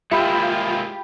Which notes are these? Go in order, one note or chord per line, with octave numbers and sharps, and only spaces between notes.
G#3 A#3 E4 F4 G4 E5 G5 B5